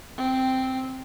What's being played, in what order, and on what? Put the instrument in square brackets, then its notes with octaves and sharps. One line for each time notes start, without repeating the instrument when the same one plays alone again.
[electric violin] C4